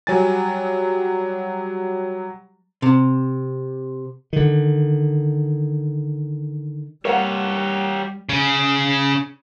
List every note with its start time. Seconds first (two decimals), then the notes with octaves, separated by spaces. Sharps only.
0.07 F#3 G3 G#5 A6
2.82 C3
4.33 D3 D#3
7.05 G3 G4 A#4 C#5 F5 F#5
8.29 C#3 C#4